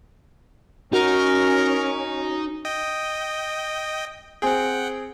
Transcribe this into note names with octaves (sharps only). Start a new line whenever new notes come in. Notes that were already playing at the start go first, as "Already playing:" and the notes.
C#4 D#4 F#4 A#4
D#5 G5
C4 G#4 F#5 G5